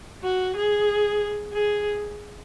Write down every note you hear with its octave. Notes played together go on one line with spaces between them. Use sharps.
F#4
G#4
G#4